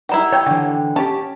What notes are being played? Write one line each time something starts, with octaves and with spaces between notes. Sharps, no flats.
D#3 G3 E4 F#5 A#5
C#5 G5
D3 E3 F#5 G5
C#4 G4 A5